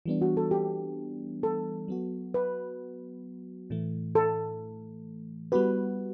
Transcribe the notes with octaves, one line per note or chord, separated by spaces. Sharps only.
E3 G3 B3 D4
F#4
A4
G4
A4
F#3 B3 F#4
B4
A2 E3 A3
A4
G3 B3 F#4 B4